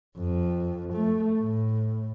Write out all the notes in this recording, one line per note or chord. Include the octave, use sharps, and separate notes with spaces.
F2
A3
A2